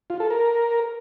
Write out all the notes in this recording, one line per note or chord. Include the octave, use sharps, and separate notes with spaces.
F4
A4
A#4